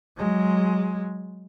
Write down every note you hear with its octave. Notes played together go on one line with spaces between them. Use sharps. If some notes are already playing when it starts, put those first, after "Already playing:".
F#3 G#3